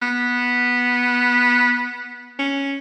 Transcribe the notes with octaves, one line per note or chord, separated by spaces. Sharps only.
B3
C#4